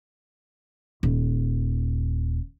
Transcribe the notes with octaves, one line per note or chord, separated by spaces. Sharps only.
D#1